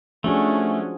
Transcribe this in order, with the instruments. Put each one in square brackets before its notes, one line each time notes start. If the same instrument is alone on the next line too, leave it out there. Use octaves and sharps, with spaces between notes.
[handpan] F3 F#4 G#4 [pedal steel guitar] A3 [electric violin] C#4 D4